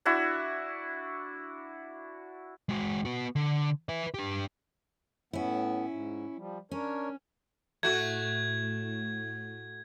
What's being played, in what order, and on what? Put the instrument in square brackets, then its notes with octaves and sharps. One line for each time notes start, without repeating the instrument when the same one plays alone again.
[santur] D4 E4 F#4
[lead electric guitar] G#3 F#4
B3 F#4
D3
B4 E5
D4 G4
[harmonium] A2 B3 [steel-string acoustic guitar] C#4 E4
[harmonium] G#2
F3 G3
[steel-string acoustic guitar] C#4 [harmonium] D4 A#4 C#5
[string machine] A2 [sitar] A3 F#4 [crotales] G#6